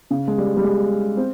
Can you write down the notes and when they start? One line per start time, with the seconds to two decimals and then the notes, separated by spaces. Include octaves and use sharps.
0.11 C#3
0.28 G#3
0.38 G3
0.57 G3
0.64 G#3
1.17 C4